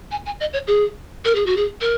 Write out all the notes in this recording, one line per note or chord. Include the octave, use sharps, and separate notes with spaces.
G#5
G#5
D#5
C#5
G#4
A#4
G#4
F#4
G#4
A#4